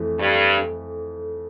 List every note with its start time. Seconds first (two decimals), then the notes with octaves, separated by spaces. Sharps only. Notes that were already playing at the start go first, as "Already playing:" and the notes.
Already playing: F2 E3 A3
0.19 G2